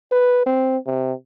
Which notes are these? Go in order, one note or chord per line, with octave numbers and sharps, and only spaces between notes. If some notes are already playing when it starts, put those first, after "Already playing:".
B4
C4
C3